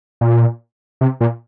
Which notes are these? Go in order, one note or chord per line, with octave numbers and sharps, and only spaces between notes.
A#2
C3
A#2